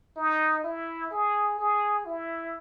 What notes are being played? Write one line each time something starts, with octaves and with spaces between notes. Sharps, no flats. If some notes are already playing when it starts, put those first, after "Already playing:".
D#4
E4
G#4
G#4
E4